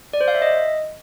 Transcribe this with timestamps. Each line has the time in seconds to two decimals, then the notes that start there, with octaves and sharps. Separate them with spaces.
0.13 D5
0.21 C5
0.28 F5
0.35 E5
0.42 D#5